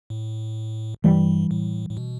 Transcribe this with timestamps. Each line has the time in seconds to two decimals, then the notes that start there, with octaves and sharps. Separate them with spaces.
0.10 A2
1.04 G2 E3 G3
1.51 A2
1.89 A2
1.97 B2